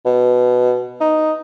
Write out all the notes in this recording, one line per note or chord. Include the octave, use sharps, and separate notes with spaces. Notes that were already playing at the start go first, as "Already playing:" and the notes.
B2
D#4